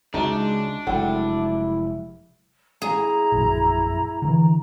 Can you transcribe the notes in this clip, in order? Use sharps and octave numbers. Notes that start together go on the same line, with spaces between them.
C#2 C#3 G#3 D4 D#4 F#4 E5
F1 F#3 G#3 E4 A4 F#5 G5
E4 G#4 A#5
A#1 F#2
D3 E3